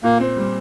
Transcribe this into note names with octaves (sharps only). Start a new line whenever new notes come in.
A#2 A#3
C4
G3